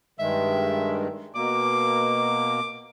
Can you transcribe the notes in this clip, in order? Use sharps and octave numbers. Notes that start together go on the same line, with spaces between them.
G2 D#3 G#3 E5
B2 A#3 D6